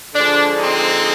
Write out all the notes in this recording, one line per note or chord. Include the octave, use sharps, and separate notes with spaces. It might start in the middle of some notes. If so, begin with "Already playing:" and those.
D3 F3 G#3 D4
C4 D#4